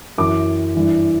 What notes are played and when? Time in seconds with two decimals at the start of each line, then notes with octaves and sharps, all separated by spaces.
0.18 F#2 E3 D6
0.75 G2 E3